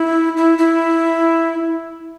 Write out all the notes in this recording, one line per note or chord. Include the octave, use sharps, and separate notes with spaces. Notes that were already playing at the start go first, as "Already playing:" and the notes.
Already playing: E4
E4
E4